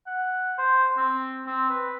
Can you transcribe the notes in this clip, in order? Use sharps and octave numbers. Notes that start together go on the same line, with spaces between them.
F#5
C5
C4
C4
B4